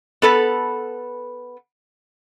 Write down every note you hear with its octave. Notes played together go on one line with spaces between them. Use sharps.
B3 A4 B4